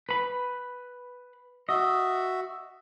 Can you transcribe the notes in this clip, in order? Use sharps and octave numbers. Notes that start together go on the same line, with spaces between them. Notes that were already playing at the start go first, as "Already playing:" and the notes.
B4 B5
F#4 D#5 E5